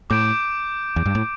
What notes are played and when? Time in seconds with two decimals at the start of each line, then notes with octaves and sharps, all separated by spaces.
0.10 A2 D6 G6 D7
0.96 E2
1.06 G2
1.15 A2